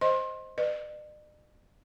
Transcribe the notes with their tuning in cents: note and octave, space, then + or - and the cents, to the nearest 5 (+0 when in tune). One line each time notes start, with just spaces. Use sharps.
C5 +0 D#5 +0 C6 +25
B4 +0 D5 +45